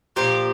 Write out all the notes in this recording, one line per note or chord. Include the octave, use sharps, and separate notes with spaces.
A#2 F3 A#3 G4